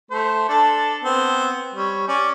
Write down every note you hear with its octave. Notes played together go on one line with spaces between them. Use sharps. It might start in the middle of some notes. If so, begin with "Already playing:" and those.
A3 C5
D4 A4
B3 C4
G3 C#5
C#4 D5